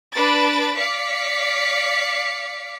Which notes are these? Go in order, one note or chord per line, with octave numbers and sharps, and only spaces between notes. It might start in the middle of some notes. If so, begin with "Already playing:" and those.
D4 B4 B5 A6 D7
D5 F5 D6 B6 C#7